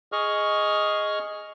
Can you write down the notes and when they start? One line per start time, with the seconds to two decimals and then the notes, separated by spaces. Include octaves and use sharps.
0.12 G#4 D#5 C#6 F6